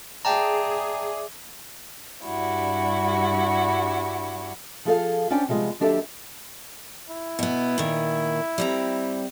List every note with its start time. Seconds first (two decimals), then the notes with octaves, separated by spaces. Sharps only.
0.25 G#4 D5 E5 G5 A5 A#5 D6
2.25 G2 G3 D4 E4 F#4
4.85 F3 G#4 A4 F5
5.30 C#4 D4 C5 D5 F#5 G5
5.48 C3 F3 G3 G#3 B3
5.80 D#2 F#3 D4 G4 A4 E5
7.09 E4
7.39 B2 B3
7.78 A#2 D#3
8.58 G3 C4 A#5